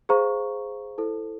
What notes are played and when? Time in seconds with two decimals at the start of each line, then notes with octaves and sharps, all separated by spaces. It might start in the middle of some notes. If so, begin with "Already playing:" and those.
0.09 G#4 C5 F5 A#5 C#6
0.98 E4 A4 C5